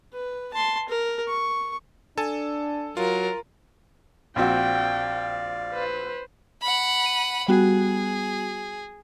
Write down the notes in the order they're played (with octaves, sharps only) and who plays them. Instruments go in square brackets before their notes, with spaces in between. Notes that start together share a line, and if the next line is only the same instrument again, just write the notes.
[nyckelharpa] B4
A5 C6
A#4
C#6
[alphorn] D4 [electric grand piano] A4 G#5 A5
[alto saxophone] F#3 [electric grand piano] F4 [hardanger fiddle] A#4
[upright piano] A#1 C4 F#4 [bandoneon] D5 F5 [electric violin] G5
[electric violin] B4 C5
[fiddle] F#5 B5
[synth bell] D#7
[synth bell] G3 B3 F#4 [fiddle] G#4